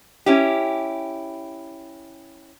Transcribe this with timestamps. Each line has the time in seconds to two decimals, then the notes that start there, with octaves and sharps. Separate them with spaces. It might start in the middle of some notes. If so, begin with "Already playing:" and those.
0.26 C#4 E4 G4